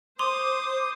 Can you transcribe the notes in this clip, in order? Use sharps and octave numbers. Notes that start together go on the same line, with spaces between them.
C5 C6 D6 D#6 F7